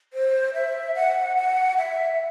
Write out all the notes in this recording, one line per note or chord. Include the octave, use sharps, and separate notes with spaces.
C5
E5
F#5
F#5
E5